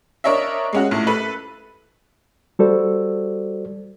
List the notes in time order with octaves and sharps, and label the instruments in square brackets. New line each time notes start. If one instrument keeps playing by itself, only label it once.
[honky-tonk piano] D4 A#4 C#5 D#5 E5
G#3 C#4 F#4
A#1 A2
A4 B4 F#7
[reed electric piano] G3 F#4 A4 C5 D5